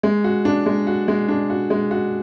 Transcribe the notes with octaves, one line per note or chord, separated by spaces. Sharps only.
G#3
F#4
D4
G#3
F#4
G#3
D4
F#4
G#3
F#4